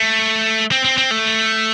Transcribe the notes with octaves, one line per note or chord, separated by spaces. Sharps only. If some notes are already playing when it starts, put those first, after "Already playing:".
Already playing: A3
C4
C4
C4
A3